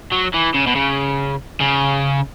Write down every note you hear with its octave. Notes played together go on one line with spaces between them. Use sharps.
F#3
E3
C#3
B2
C#3
C#3